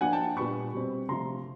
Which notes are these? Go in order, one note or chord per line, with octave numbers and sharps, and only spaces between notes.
F3 A#3 D4 F#5 G#5
G5 A5
A#2 G3 B3 D4 B5 C#6
B2 G3 C4
C3 F3 A3 A#5 C6